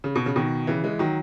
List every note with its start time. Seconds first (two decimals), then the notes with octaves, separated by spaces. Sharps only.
0.04 C#3
0.15 B2
0.26 C#3
0.36 B2 D#3
0.67 C#3 E3
0.84 E3 G#3
0.99 D#3 F#3